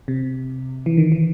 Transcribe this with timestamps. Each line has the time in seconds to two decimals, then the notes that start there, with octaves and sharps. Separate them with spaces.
0.08 C3
0.86 E3
0.97 D#3
1.12 E3